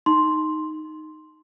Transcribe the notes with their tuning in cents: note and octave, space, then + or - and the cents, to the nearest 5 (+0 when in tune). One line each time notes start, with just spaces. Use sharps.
D#4 +0 C6 +0